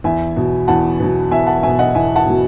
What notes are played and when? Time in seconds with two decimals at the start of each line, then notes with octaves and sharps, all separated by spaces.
0.04 E2 E5 G#5
0.36 B2 F#3
0.68 E2 F#5 A5
1.00 B2 F#3
1.31 E2 E5 G#5
1.47 F#5 A5
1.63 B2 F#3 E5 G#5
1.79 D#5 F#5
1.94 E2 E5 G#5
2.16 F#5 A5
2.26 B2 F#3